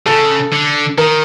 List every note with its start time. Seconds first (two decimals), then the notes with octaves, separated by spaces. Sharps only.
0.06 C#3 A4
0.53 D3
0.98 D#3 A#4